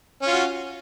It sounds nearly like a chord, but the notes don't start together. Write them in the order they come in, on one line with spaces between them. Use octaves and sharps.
C#4 F4 F#4